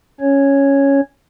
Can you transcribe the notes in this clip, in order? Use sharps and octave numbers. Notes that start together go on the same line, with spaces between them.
C#4 C#5